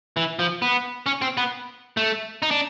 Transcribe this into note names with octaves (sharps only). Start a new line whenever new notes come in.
E3
F3
B3
C#4
C4
B3
A3
D#4
D4